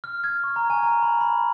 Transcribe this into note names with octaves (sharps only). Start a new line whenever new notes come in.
F6
G#6
C#6
A#5
G#5
A#5
B5
B5